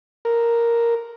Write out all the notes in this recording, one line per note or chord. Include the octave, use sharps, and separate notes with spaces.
A#4